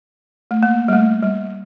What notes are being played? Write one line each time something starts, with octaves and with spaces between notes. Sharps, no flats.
A3
A#3
G3
A3
G3